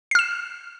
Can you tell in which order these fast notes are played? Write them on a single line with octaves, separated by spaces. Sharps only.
C7 F6 E7